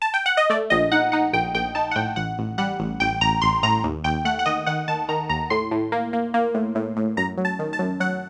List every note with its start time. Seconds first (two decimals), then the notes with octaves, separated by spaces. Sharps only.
0.02 A5
0.14 G5
0.26 F#5
0.37 D#5
0.50 A3 D5
0.70 A#1 D#5
0.92 D#4 F#5
1.12 D#4 F#5
1.33 A#1 G5
1.54 A#1 G5
1.75 D#4 A5
1.91 F#5
1.96 A2 G5
2.16 A1 F#5
2.38 A1
2.58 G3 F#5
2.79 A1
3.00 A1 G5
3.21 A1 A#5
3.42 A1 C6
3.63 A2 A#5
3.84 D#2
4.04 D#2 G5
4.25 A3 F#5
4.39 F#5
4.46 D#3 D#5
4.66 D#3 F#5
4.88 D#3 A5
5.09 D#3 A#5
5.29 D#2 A#5
5.50 A2 C6
5.71 A2
5.92 A#3
6.13 A#3
6.34 A#3
6.54 A2
6.75 A2
6.97 A2
7.17 F#2 A#5
7.38 F#3
7.45 A5
7.59 D#3
7.73 A5
7.79 F#2
8.00 F#3 F#5